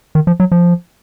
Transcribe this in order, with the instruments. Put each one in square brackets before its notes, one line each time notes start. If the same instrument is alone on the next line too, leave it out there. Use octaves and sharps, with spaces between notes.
[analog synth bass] D#3
F3
F#3
F3